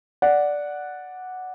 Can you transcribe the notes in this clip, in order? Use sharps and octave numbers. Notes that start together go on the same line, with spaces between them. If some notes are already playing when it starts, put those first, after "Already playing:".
D5 F#5